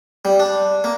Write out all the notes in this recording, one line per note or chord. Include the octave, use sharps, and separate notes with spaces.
G3
D4
A#3